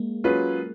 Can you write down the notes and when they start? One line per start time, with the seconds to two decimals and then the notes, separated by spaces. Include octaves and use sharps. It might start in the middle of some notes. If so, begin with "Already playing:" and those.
Already playing: G#3 A#3
0.24 F#3 C#4 F4 G#4 B4